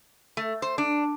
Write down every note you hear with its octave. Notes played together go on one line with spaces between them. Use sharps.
A3
C5
D4